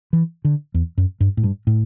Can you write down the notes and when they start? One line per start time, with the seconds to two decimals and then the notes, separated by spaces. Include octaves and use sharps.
0.13 E3
0.45 D3
0.74 E2
0.98 F#2
1.20 G2
1.37 A2
1.43 G2
1.67 A2